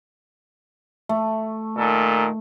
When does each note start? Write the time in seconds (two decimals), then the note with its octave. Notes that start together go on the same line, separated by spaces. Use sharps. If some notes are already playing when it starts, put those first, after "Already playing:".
1.09 A3
1.77 A#2 D#3 A4